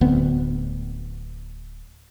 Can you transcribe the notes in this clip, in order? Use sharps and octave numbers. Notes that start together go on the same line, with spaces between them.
D1 D2 B3 C4